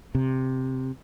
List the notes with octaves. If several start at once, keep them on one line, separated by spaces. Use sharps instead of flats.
C3